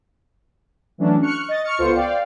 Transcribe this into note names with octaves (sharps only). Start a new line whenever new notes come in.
E3 F#3 A3 C#4 D4
C#6 F6 F#6 C#7
D#5 A6
C#6 F6 C#7
C#2 B3 F4 A4 C5 C#7
D5 F5 G5